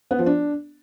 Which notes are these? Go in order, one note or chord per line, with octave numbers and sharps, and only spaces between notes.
B3
F3
D4